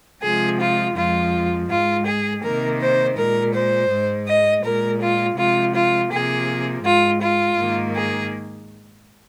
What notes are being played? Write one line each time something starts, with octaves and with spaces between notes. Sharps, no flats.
C3 F3 G#3 G#4
F4
F2 F3 G#3 F4
G#2 G#3 F4
G#4
C3 D#3 A#3 A#4
C5
A#2 G#3 A#4
C5
G#2 G#3
D#5
A#2 G#3 A#4
F4
C3 F3 G#3 F4
F4
C3 F3 A#3 G#4
G#2 G#3 F4
F4
G#2 D#3 A#3
G#4